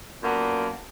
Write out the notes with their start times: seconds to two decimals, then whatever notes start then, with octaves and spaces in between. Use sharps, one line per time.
0.22 F#2 A#2 A#3 B3 A5